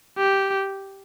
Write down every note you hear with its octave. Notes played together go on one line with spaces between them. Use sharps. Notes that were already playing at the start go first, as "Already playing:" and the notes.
G4